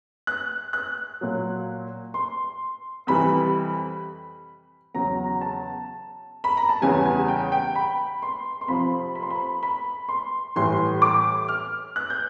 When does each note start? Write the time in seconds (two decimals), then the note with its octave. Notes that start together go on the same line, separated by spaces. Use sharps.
0.27 F#6
0.73 F#6
1.21 A#2 F#3
2.14 C6
3.07 F2 C3 E3 G3 B5
4.94 E2 C#3 F#3 A#5
5.41 A5
6.44 B5
6.57 A#5
6.69 A5
6.82 E2 C#3 E3 G3 G#5
7.06 G#5
7.28 G5
7.52 G5
7.75 B5
8.22 C6
8.61 C6
8.68 F2 C3 F3 B5
9.15 B5
9.22 C6
9.30 B5
9.63 B5
10.09 C6
10.56 A2 E3 G3 C6
11.02 D6
11.49 F6
11.96 F#6
12.10 G6